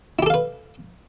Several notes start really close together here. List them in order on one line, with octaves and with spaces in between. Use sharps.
E4 G4 A4 F5 B4